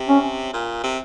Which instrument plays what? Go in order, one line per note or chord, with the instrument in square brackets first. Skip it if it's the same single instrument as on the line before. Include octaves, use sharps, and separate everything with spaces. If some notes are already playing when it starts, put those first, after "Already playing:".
Already playing: [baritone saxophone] C3
[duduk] C#4
[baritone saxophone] A#2
C3